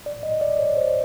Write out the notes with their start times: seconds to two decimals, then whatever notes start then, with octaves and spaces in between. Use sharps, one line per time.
0.06 D5
0.23 D#5
0.41 D5
0.59 C#5
0.77 C5